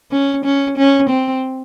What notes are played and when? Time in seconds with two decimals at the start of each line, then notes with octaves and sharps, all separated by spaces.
0.12 C#4
0.45 C#4
0.77 C#4
1.09 C4